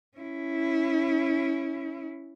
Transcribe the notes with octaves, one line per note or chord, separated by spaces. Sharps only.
C#4 E4